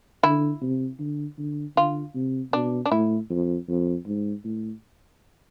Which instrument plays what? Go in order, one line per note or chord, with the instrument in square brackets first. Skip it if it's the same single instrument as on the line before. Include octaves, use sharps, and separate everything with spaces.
[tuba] D3 [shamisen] E4
[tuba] C3
D3
D3
[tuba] D3 [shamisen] F4
[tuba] C3
[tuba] B2 [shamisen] D4
[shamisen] D4
[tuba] A2 [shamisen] E4
[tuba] F2
F2
G#2
A2